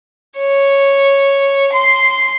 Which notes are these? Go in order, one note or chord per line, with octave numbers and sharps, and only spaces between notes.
C#5
C6